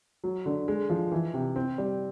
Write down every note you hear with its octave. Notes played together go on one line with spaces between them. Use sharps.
F#3
D3
G#3
F3
E3
C3
C4
G3